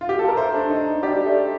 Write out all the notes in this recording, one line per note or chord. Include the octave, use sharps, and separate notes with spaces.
F4
G4
A4
A#4
A3 C5
D4
D#4
D#4
G3 G4
A3